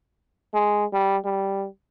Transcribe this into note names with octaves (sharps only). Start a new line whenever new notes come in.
G#3
G3
G3